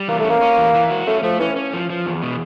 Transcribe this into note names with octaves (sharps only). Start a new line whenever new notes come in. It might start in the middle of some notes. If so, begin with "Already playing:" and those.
Already playing: G3
E3 A#3
A3
C#4
A#3
C#4
E3
E3
F#4
A3 C#4
F3 A3
E3 C#4
C#4
F3
F3
E2
B2